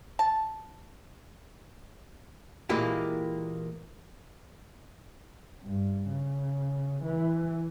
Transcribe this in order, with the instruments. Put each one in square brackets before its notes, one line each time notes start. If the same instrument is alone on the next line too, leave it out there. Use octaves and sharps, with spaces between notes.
[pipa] A5
[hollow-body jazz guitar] A#2 E3 G#3 A#3 E4 G4
[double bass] G2
C#3
E3